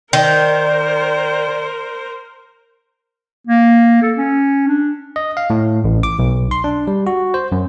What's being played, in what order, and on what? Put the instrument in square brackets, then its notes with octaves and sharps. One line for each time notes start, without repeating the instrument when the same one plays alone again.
[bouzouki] D#3 [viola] A#4 C5 [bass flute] D5
[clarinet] A#3
A4
C#4
D4
[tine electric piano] D#5
F5
A2
A1
D6
B1
C6
D4
G3
F#4
C5
F#2